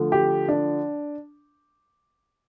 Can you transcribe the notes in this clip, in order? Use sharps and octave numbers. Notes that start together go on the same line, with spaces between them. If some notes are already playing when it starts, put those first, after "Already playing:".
Already playing: D3 F3 A3
G4
D4